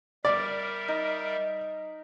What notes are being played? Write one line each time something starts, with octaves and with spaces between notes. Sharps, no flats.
G3 A#4 D5 E5
D#4